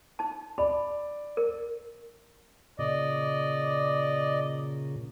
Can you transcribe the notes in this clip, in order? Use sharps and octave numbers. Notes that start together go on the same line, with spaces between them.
D#4 A5
D5 B5
A#4
A#2 C#3 D5 D#5